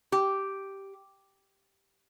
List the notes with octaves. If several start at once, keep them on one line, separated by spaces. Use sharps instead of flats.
G4